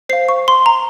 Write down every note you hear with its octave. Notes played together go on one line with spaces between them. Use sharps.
C5 F5 C7
C#6
C6
A#5